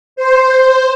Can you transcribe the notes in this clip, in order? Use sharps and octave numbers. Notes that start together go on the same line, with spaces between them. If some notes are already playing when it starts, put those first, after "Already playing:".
C5